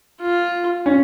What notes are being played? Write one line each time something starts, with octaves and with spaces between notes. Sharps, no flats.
F4
C#4